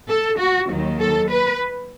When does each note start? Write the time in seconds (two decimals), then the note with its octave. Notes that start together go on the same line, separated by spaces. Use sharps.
0.09 A4
0.38 F#4
0.68 D#2 D#3 F#3
1.00 A4
1.30 B4